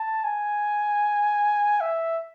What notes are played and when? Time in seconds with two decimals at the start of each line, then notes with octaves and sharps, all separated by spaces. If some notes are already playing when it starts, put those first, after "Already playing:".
Already playing: A5
0.24 G#5
1.81 E5